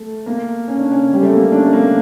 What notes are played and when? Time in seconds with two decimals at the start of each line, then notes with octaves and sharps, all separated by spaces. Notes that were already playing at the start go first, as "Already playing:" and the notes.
Already playing: A3
0.26 A#3
0.68 C#4
0.79 D4
0.92 C#4
1.13 G3
1.22 A3
1.33 A#3
1.42 C#4
1.52 D4
1.64 A3
1.73 A#3